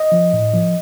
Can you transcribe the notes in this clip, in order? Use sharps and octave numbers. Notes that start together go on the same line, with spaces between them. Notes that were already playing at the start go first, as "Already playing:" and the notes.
Already playing: D#5
F3
A2
F3